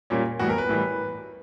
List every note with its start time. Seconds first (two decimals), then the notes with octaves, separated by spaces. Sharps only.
0.10 A#2 G3 A#3 C#4
0.39 A2 E3 G3 B3 F#4
0.49 A#4
0.58 B4
0.69 A2 E3 G3